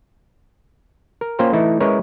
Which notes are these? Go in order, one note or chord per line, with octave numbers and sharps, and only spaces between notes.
A#4
A#3 C#4 F4 C5 G5 A#5
E3 A3 D#4 E4
G#3 C#4 E4 A#4 B4 C#5